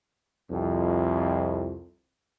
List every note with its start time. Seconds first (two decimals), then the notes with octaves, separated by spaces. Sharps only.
0.50 C2 F2